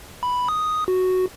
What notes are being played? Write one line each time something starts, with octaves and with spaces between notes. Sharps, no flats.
B5
D#6
F#4